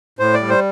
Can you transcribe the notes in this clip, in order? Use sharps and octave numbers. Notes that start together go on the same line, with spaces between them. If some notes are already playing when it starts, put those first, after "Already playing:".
A2 C5
D5
G3
C5